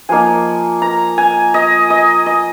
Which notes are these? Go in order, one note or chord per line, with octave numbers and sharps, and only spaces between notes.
F3 A#3 D#4 G#5
A#5
G#5
D#5
D#5
D#5